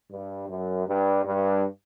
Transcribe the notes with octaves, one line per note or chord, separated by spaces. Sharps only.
G2
F#2
G2
G2